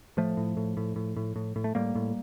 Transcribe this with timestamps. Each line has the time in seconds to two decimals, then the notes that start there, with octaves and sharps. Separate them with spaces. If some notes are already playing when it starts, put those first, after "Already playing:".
0.17 A2 F3 A3
0.37 A2
0.57 A2
0.77 A2
0.96 A2
1.17 A2
1.36 A2
1.56 A2
1.64 A3
1.75 A2 G3 A#3
1.95 A2